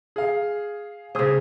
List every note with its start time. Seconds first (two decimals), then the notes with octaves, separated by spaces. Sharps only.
0.16 G#4 F5
1.15 C#3 G#4 C5 D#6